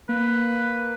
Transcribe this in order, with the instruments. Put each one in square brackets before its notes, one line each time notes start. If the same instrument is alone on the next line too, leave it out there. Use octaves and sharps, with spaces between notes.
[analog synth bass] A#3 [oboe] B4